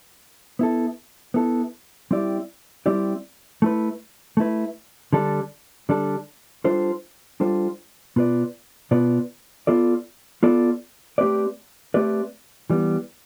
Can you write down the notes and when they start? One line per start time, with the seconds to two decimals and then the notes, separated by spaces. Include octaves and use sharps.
0.59 B3 E4 A4
1.34 B3 E4 A4
2.11 G3 C4 E4 G4 D5
2.86 G3 C4 E4 G4 D5
3.62 A3 E4 B4
4.37 A3 E4 B4
5.13 D3 G3 D4 A4
5.89 D3 G3 D4 A4
6.64 G3 D4 F4 A4 C5
7.40 G3 D4 F4 A4 C5
8.16 B2 B3 F4 B4 D5
8.91 B2 B3 F4 B4 D5
9.67 B3 F4 A4 D5
10.43 B3 F4 A4 D5
11.18 A3 C4 G4 B4 D5
11.94 A3 C4 G4 B4 D5
12.70 E3 G3 B3